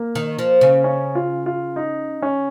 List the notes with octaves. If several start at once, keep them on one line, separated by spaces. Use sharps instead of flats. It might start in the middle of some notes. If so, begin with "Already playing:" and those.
Already playing: A#3
D#3
F3
C#3
C#4
F4
F4
D#4
C#4